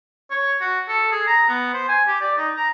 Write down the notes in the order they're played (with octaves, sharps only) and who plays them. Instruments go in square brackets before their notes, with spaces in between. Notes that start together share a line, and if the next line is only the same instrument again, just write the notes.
[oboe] C#5
F#4
A4
G#4
A#5
B3
C5
G#5
G4
D5
D#4
A#5